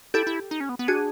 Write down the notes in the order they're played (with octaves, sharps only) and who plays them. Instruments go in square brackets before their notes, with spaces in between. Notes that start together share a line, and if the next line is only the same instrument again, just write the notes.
[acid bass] E4 [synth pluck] G4 A4
[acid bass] E4
D#4
C#4
B3
B3
[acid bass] D4 [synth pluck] F#4 G#4